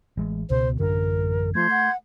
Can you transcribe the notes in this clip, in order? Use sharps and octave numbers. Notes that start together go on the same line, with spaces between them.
A1 G#3
C#2 B2 C5
A1 F#2 D3 A#4
F3 A3 C6 G6 G#6
F#5